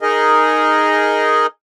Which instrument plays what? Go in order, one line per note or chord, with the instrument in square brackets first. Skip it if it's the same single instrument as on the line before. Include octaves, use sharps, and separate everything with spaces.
[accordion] D#4 G#4 A#4 D#5